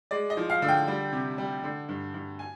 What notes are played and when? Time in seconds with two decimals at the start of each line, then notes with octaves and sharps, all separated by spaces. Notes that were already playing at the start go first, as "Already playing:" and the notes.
0.11 G#3 D5
0.30 D#5
0.37 F3
0.50 F5
0.62 D3
0.68 G5
0.88 G3
1.13 C3
1.38 G3
1.64 D3
1.89 G2
2.14 G2
2.39 G#5